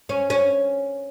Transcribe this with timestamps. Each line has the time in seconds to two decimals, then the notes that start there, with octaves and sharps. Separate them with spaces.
0.09 C#4
0.30 C#4